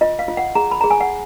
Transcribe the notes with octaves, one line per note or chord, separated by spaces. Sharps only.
F4 D#5
F5
F4
F#5
G#4 A#5
B5
G#4 A#5
G#5
F#5